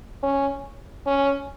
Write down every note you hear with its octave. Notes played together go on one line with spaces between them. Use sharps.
C#4
C#4